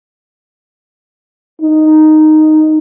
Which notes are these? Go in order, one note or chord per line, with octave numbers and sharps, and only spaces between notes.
D#4